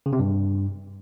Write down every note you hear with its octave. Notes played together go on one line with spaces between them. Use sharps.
C#3
C3
G2